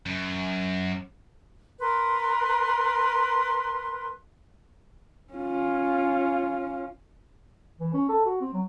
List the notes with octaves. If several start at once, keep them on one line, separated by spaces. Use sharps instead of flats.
F#2
A#4 B4 C6
C#4 F4
E3
C#4
A4
F#4
C4
F#3